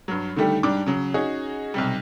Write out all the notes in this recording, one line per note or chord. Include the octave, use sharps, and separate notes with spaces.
G2 F#3
D3 D#3 G3 A3 G4
G#2 G3 D4 D6
C#3 F#3
C#4 D#4 F#4 G#4
B1 C3 G3